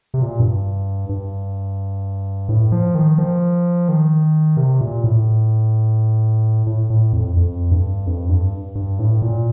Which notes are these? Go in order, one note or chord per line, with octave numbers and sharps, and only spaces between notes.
C3
A#2
G2
G2
A2
F3
D#3
F3
D#3
C3
A#2
A2
A2
A2
F2
F2
G2
F2
G2
G2
A2
A#2